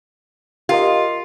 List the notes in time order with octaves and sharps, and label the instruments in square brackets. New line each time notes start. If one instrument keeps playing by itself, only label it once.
[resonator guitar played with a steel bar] F4 [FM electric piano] G4 A#4 D#5